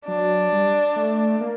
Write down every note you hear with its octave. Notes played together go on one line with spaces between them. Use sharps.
F#3 D4
G3
A3
A#3